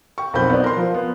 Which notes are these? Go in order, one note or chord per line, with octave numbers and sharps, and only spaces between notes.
G5 C#6
B1 F2 C4 A#4 B5 G6
B3 C4 D#4 D5
A#4 C6
F3
B3